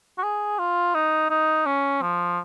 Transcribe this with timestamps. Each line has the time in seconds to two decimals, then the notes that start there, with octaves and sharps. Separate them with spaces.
0.18 F#4
0.23 G#4
0.59 F4
0.95 D#4
1.30 D#4
1.66 C#4
2.02 F3